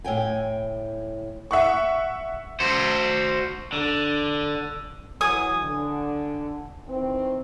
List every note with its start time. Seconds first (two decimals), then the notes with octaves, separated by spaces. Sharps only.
0.04 A2 C#5 G5 G#5
1.51 E5 F#5 C#6
2.60 F#4 C5
3.73 D3
5.21 E3 F#3 G#5 D#6
5.61 D3
6.88 D#3 E3 C4